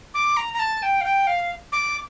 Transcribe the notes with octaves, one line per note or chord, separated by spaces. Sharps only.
D6
A#5
A#5
A5
G5
F5
G5
F5
D6